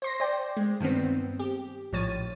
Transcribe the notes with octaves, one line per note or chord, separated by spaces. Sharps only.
C5 C6 A#6
C5 D5 G5
G#3
G2 D#3 B3 C4
G4
A#1 A2 F3 C#5 A6 D#7